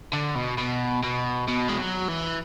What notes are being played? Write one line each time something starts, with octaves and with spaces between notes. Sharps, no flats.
D3
B2
B2
B2
B2
G#3
F#3
E3